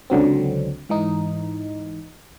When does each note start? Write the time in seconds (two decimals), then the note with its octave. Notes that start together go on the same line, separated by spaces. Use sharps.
0.10 C#2 D3 F#3 C4
0.89 G#2 E3 D#4